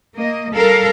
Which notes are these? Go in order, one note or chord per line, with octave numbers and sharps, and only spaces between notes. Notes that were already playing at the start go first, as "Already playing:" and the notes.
A#3 D#5
G3 A4 A#4 F5